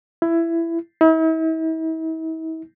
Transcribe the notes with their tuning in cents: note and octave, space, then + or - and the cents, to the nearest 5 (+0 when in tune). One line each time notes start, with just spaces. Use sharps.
E4 +15
E4 -45